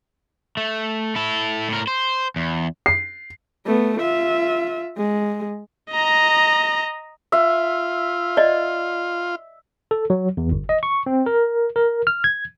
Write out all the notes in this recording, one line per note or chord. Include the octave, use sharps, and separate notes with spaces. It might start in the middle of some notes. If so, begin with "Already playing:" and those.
A3
E4 A4
A2 A#4
C5
E2
C7
A3 B3
F4 E5
G#3
D#5 A#5
F4 E5
D5 D#5
A4
F#3
E2
G1
D#5
C#6
C4
A#4
A#4
F6
G#6